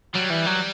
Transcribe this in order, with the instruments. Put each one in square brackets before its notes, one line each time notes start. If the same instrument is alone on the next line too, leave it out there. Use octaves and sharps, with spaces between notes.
[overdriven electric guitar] F#3 [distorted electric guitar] G3
[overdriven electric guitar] E3
F#3